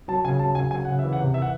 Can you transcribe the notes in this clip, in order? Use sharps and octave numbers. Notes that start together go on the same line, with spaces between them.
F#3 A5
C#3 G#5
F#3 A5
C#3 G#5
F#3 G#5
C#3 F#5
E3 E5
F#5
C3
E3 E5
F#5